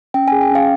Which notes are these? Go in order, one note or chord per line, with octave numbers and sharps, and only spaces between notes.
C#4 G5
G#5
G#4
G5
C#4 F5